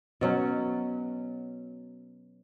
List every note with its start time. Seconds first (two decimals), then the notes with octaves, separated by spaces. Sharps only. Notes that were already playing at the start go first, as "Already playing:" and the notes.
0.21 B2 F#3 C#4